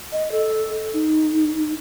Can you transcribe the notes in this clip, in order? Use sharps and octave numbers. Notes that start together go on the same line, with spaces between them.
D#5
A4
D#4